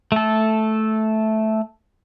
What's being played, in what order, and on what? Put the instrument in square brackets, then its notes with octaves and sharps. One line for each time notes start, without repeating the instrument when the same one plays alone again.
[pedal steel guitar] A3 A4